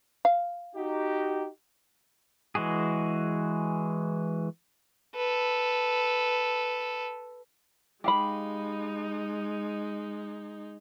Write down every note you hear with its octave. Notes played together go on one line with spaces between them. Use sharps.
F5
D#4 F#4 G4
E3 G#3 F#4 G#4
A4 B4
G#3 D#4 G4 F5 B5